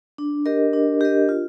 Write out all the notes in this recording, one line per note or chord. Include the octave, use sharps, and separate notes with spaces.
D4
G4 A#4 D#5
D4
G4 A#4 D#5
F4